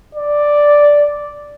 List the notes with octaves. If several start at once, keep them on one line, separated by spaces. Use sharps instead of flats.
D5